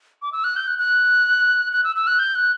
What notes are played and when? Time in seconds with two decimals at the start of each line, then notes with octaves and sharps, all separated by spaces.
0.22 D6
0.32 E6
0.44 F#6
0.56 G6
0.67 F#6
0.79 F#6
1.73 F#6
1.84 E6
1.96 E6
2.07 F#6
2.19 G6
2.35 F#6